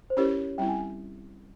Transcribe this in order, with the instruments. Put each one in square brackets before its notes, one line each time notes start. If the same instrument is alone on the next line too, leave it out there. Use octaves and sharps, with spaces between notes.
[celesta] C5
[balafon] C#4 E4 G4 A#4 [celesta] C#5
[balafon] G3 C4 E4 [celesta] G5
[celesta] G#5